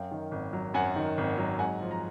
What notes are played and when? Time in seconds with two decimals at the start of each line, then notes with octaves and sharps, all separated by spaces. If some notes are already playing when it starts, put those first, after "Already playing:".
Already playing: F#2 F5 G5
0.11 D#3
0.31 G#1
0.53 F#3
0.74 F#2 F#5 G#5
0.96 D#3
1.17 G#1
1.38 F#3
1.59 G#2 F#5 G#5
1.81 F3
1.91 A#5